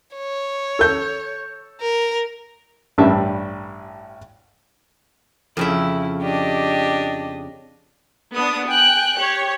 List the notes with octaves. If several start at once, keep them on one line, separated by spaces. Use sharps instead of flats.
C#5
A4 G6
A#4
A1 G2 G3 E5 A5
F2 C#3 E4 E5
D4 G4 D#5
B3 D4 D#6
G5 G#5 F#6
G4 C#5